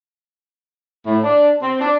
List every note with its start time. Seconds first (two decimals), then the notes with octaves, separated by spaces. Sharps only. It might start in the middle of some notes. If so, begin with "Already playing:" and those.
1.05 A2
1.23 D4
1.61 C4
1.80 D4